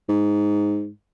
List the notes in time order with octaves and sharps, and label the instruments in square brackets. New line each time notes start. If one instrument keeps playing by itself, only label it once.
[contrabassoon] G#2